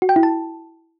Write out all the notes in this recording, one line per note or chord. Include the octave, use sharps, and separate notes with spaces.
F#4
G5
E4
A5